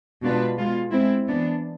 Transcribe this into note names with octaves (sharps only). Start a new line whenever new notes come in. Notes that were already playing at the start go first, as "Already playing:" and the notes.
B2 G#3 D4 F4 B4
G#3 B3 F4
G#3 C4 E4
E3 B3 D4